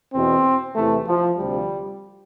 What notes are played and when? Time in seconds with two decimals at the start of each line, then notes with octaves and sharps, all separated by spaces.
0.12 E2 B2 C4
0.76 E2 C3 E3 A3
1.07 F3
1.38 D2 C3 F3 G3